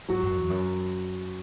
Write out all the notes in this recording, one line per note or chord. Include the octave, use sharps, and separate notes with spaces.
G#2 F#3 F#4
F#2
E2
F#2